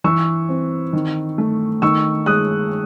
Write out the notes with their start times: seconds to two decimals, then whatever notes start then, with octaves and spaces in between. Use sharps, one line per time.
0.04 E3 C#6 E6
0.49 C4
0.93 D#3
1.38 A3
1.82 D#3 C#6 E6
2.26 G#3 D#6 F#6